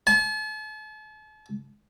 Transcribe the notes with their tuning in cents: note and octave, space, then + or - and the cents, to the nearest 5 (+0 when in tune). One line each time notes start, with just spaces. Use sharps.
A5 -40